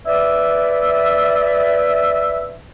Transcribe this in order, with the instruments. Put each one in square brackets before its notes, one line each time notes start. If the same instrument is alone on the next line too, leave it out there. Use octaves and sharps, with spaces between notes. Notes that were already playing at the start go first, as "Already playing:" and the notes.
[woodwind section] B4 D5 E5